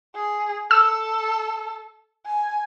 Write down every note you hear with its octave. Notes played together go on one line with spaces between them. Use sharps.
G#4
A4 E6
G#5